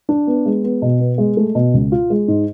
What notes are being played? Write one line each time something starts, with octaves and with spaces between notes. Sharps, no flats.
D4
B3
G#3
B3
B2
B3
G#3
A3
B2
C#2
F4
G#3
G#2